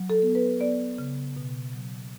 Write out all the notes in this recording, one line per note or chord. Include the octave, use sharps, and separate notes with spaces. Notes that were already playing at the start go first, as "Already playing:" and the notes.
Already playing: F#3
A4
B3
B4
B3 D5
C#3
B2
F#3